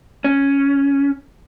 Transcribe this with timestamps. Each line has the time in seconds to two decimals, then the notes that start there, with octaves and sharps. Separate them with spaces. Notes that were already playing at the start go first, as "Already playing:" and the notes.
0.24 C#4